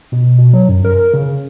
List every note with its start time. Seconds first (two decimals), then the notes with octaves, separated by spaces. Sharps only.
0.12 B2
0.38 B2
0.53 F#3
0.69 F#2
0.85 A#4
1.14 C#3